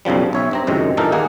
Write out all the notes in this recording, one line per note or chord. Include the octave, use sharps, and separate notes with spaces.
B1 F#2 C#3 F3 G3
B1 C#5 E5
G2 C4 A#5
C#2 F#2 A2 C3 D#3 G#3
G2 A#2 E3 D#4 A4 A#4
D#2 A#3 G#4 F#5